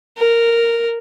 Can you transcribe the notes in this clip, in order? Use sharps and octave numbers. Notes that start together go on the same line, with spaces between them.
A#4